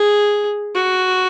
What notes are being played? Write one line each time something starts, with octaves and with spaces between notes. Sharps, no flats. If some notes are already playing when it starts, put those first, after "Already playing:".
Already playing: G#4
F#4